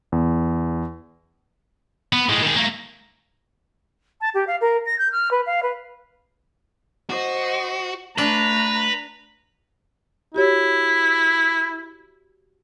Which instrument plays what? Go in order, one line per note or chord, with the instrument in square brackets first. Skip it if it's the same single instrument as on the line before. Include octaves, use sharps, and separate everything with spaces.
[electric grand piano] E2
[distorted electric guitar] B3
A2 G#3
D#3 G#4
A3 A#3
[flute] A5
G4
F5
A#4
A#6
G6
F6
B4
F5
B4
[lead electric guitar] F#4 [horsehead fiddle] C5 D#5
[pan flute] A3 [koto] D4 [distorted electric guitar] B4 [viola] A#5
[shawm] E4 [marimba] F#4 G4 C#5